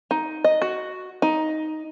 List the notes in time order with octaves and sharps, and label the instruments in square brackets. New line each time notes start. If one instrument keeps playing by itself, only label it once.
[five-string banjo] D#4
D#5
F#4
D#4